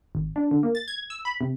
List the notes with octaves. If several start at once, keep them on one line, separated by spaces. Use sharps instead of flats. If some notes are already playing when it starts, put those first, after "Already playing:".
G#1
D4
D3
A#3
A6
G#6
E6
B5
C3